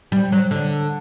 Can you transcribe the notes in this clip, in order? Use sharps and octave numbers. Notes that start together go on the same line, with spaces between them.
G3
F#3
D3